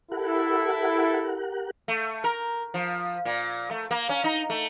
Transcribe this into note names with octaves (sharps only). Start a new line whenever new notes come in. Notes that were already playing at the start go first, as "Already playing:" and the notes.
E4 G4 A4 A#4 F#5
A3
A#4
F3
A#2
A3
A#3
C#4
D#4
A3